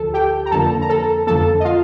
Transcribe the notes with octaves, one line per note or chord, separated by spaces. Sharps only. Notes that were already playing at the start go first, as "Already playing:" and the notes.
Already playing: D2 F3 A4 A5
G4 G5
A#5
F2 D3 F3 A#3 A4 A5
A#5
A4 A5
F2 D3 F3 A#3 A4 A5
D#5
F4 F5